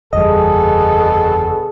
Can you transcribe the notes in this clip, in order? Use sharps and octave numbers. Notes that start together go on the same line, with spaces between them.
F#1 E2 B2 D3 G3 G#4 A4 D#5